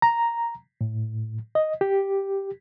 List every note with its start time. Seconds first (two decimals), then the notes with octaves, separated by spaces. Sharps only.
0.02 A#5
0.81 A2
1.55 D#5
1.81 G4